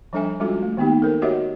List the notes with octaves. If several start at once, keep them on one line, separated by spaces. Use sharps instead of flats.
F3 G3 D4 A4 E5 G#5
G3 G#3 C#4 F4 F#4 A4
A3
D#3 A#3 B3 D#4 G4
A4 A#4 C5
F#4 G4 C#5 D#5 E5 F#5